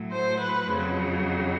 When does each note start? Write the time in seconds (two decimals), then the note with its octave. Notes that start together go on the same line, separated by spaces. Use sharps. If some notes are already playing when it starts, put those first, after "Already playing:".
Already playing: A2 F#3
0.12 C5
0.41 B4
0.71 F2 C#3 F#3